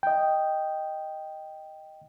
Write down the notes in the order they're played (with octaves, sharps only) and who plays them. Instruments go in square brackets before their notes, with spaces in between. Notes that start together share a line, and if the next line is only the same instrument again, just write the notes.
[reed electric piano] D#5 G5